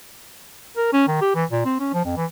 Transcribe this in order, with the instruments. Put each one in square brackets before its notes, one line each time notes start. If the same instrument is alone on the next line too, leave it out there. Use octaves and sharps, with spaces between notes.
[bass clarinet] A#4
C#4
D#3
G4
E3
A#2
C4
C#4
F3
F2
E3